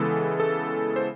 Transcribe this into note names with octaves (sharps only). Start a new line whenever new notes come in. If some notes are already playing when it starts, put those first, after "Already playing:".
Already playing: C#3 E3 G#3 B3 A4
A4
C5